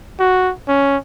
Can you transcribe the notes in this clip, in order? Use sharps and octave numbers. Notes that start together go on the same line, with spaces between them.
F#4
C#4